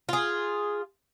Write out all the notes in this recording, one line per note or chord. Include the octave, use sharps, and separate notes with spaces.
F4 G#4